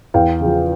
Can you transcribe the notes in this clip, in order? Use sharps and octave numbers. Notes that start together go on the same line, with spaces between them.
E2 F5 G5
C#3 F3